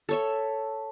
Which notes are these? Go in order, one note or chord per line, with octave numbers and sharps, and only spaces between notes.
A4 C#5 E5